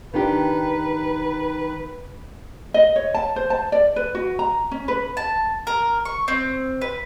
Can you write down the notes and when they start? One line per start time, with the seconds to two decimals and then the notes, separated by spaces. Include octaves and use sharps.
0.13 D#3 D4 G4 B4
2.74 D#5
2.96 C#5
3.14 A5
3.36 C5
3.50 A5
3.72 D5
3.96 B4
4.15 F#4
4.39 A#5
4.71 C#4
4.88 B4
5.17 A5
5.67 A#4
6.05 C#6
6.28 C4
6.81 B4